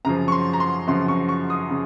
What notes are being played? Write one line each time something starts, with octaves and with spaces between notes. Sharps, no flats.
F#2 C#3 F3 A#5
C#6
C6
A#5
C6
F#2 C#3 F3 C6
C#6
C#6
D#6
C#3